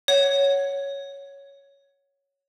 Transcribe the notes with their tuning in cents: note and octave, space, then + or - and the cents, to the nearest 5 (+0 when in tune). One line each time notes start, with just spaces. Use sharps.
C#5 +0 F#5 +0